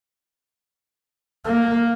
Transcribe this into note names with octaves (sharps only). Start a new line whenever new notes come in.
A#3